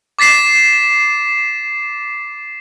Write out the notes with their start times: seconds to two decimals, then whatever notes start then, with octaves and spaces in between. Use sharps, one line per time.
0.19 D6 A6 B6 C7 E7